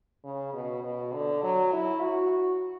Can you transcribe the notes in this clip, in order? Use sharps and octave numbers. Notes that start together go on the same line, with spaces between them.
C#3
B2
B2
D3
F#3
E4
F#4